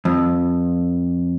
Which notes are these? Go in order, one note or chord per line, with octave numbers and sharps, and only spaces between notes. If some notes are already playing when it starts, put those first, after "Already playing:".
F2